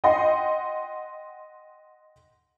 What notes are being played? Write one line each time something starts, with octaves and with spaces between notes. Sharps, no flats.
D#5 F#5 G5 C6